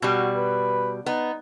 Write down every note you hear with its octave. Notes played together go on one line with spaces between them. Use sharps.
B2 G3 F#4
B4
B3 D#4